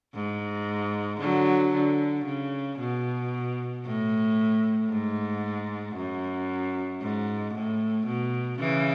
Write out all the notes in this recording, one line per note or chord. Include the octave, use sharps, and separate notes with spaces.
G#2
D3 F#3
D3
C#3
B2
A2
G#2
F#2
G#2
A2
B2
C#3 E3